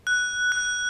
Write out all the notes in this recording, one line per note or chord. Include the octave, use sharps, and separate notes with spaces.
F#6
F#6